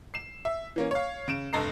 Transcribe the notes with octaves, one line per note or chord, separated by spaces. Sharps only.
C7 E7
E5
E3 A#3 C#4
C#5 F5
C#3 D7 E7
F1 G2 A4 D#5 A#5 C7